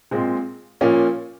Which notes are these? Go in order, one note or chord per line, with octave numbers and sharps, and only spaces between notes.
A#2 G#3 C4
A#2 F3 A#3 C#4